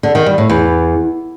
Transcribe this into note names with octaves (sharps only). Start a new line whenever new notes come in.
D3
D#3
G3
A2
E2